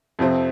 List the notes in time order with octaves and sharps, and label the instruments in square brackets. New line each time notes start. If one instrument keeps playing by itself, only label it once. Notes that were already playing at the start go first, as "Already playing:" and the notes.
[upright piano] F2 C3 F3 C4